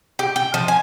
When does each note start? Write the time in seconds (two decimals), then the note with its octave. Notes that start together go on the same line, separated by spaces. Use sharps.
0.19 G4
0.36 G5
0.54 F3
0.68 G#5